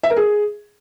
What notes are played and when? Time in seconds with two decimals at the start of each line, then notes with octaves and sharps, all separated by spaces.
0.03 E5
0.10 A#4
0.16 G#4